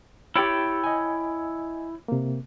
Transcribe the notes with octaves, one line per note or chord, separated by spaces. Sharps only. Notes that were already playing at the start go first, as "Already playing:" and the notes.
E4 G4 C#5 G5 A6
D#5 G#5
C3 A#3